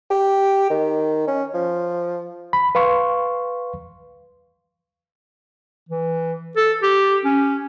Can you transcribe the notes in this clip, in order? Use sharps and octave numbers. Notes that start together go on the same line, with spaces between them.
G4
D#3
C#4
F3
B5
B4 F5 C6 C#6
E3
A4
G4
C#4